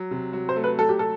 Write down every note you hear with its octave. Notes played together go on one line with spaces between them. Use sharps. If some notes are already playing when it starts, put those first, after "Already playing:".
Already playing: F#3
C3
F#3
C5
A3
B4
F#3 A4
G4
A4